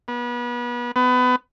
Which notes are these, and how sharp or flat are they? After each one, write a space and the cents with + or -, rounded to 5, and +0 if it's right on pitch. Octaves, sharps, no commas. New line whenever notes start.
B3 -30
B3 +25